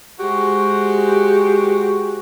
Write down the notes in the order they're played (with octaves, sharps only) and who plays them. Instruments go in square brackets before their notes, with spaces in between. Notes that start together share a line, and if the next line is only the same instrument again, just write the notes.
[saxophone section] G#3 F#4 G4 C5